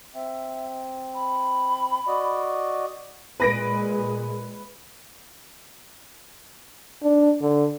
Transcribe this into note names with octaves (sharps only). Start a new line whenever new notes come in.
C4 E5
B5
F#4 D5 D#5
A#2 G#3 B4 A#6 D7
D4
D3